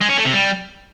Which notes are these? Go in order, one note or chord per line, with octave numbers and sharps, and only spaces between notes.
G#3
C#4
A3
C3
G3